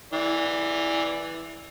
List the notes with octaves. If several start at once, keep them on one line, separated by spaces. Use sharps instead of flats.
E3 D5